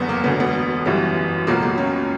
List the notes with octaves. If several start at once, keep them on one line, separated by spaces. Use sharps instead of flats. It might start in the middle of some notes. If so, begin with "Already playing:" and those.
Already playing: F#1 E2 D3 G3 B3
A#3
E1 D2 D3 B3
B3
G1 F#2 E3 G3 B3
C#2 B2 F#3 A#3
A#3
C#4